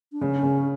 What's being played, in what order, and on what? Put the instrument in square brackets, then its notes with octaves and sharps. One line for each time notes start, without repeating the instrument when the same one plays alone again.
[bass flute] D4
[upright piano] C#3 [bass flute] C#4
[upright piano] C#3